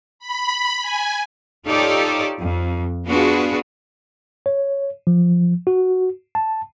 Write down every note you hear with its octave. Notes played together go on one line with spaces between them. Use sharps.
B5
G#5
D#4 F4 G4 A4 C#5 D5
F2
B3 D4 F4 F#4 G#4 B4
C#5
F3
F#4
A5